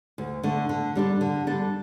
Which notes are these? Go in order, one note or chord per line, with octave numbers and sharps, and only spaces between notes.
D2
D3 A3 D4
D3
G3 D4 A4
D3
G3 D4 A4